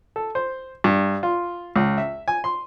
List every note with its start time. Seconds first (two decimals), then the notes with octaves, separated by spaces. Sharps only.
0.16 A4
0.35 C5
0.84 G2
1.23 F4
1.76 C#2
1.98 E5
2.28 G#5
2.44 C6